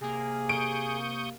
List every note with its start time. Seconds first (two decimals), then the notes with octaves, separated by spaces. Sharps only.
0.01 C3 A#3 G#4
0.49 C#6 D#6 G6 D7